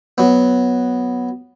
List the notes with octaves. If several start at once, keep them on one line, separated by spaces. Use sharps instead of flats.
F#3 B3